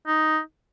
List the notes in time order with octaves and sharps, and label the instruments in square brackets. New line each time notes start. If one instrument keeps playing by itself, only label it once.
[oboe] D#4